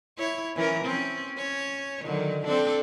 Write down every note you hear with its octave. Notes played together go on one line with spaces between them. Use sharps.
E4 C#5
E3 C#4 A#4
C4 C#4
C#4 C#5
D3 D#3 F#3
C4 D4 A4